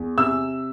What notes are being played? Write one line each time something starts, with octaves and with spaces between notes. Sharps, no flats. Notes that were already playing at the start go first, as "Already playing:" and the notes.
Already playing: E2
C3 E6